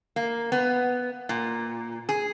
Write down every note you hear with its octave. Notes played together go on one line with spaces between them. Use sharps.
A#3
B3
A#2
G#4